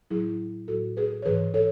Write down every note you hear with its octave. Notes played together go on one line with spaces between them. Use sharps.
A2 F#3 E4 G#4
A2 F#3 F#4 A4
G#4 B4
C#5
G#2 E3 G#4 B4
A4 C#5